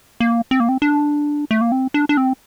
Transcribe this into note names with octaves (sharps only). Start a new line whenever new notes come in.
A#3
C4
A#3
C4
D4
A3
A#3
C4
D4
D4
C4